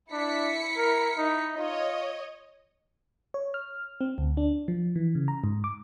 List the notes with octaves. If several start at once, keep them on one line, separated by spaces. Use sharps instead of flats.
D4 E4 B6 C#7
A#4
D#4
F4 C#5 D#5
C#5
F6
C4
D2
D4
F3
E3
C#3
A#5
G#2
D6